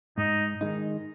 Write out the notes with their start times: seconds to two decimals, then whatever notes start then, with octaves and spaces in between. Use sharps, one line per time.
0.18 G#2 D#4
0.61 D#3 G#3 D#4